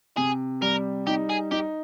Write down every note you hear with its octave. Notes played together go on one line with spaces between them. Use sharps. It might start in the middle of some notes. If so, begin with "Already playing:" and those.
C3 G#4
G3 A#4
D#4 G4
G#4
D#4 G4